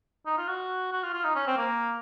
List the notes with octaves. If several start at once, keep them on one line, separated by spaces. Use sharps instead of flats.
D#4
F4
F#4
F#4
F4
F4
D#4
C#4
C4
A#3